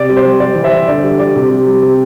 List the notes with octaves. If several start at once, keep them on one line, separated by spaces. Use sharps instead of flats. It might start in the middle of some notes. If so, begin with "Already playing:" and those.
Already playing: C3 D5
G3
C5
G3
G3 D5
E3
C5 E5
E3
D3 D5
G3
G3 D5
C3
G3
G3
C3